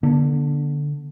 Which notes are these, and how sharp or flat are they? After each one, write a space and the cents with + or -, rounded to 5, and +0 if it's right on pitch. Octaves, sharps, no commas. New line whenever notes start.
D3 +0 B3 -45 D4 -45